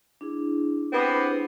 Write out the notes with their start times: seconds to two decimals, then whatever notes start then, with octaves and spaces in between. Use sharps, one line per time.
0.21 D4 E4 G#4
0.93 B3 C4 G4